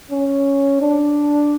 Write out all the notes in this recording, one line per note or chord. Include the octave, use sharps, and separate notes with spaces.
C#4
D4